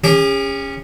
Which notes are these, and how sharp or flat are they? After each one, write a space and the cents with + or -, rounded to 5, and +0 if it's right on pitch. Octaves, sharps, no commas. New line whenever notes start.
C#4 +0 G#4 -45 D6 +0